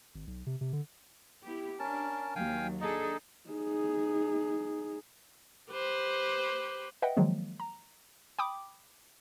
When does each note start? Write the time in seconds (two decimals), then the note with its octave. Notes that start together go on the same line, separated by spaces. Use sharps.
0.15 G#1
0.27 B1
0.46 C3
0.61 C3
0.73 D3
1.46 B3 E4 G4
1.79 C#4 D4 A#4 A5
2.36 D#2 F#3 F5 G5 G#5
2.81 D4 D#4 G#4 A4 D#5
3.50 D#4 G#4
5.70 G4 B4 C5
7.02 B4 D#5 E5 F#5 G5
7.17 D#3 F3 F#3 G#3 A#3
7.60 A#5
8.39 G5 B5 D6 D#6